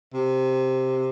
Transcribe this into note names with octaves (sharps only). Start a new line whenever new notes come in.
C3